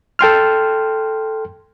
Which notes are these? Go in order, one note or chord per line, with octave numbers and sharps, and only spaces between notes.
A4 G5 C6 F6